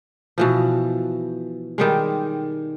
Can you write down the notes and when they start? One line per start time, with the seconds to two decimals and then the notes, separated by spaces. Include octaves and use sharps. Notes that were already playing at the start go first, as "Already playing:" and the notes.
0.38 B2 E3 F3
1.78 D#3 G3 G#3